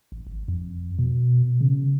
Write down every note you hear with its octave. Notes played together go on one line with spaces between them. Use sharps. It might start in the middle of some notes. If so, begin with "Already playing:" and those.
A1
G#1
F2
B2
C#3